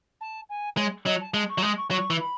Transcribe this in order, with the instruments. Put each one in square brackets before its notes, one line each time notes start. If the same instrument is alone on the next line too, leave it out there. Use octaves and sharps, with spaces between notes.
[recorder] A5
G#5
[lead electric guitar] G#3 [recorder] C#5
[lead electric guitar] F#3 [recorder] D#5
[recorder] A5
[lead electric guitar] G#3 [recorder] A5
[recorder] C#6
[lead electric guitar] F#3
[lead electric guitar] G#3 [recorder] D#6
[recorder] C#6
[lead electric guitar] F#3 [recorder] C#6
[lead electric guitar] E3
[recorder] B5